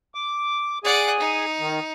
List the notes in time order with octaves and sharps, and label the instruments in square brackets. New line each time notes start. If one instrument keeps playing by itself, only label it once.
[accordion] D6
[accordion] G#4 G#5 [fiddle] D5 F#5
[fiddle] D#4
[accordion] D#3